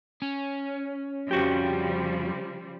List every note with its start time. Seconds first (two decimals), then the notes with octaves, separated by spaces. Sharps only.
0.22 C#4
1.31 F2 C#3 F3 G3 F#4 G4